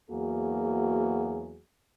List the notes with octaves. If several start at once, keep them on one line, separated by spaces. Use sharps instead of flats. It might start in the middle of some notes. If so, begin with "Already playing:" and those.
E2 F#3 A#3 F#4 G#4